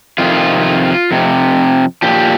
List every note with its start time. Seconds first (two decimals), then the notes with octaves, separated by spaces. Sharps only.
0.18 F2 C3 D#3 F4
1.11 F2 C3
2.02 A#2 F3 G4